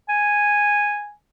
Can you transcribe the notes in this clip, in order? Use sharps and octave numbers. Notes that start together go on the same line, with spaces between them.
G#5